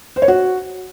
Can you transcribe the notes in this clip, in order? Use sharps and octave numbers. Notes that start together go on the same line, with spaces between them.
C5
C#5
F#4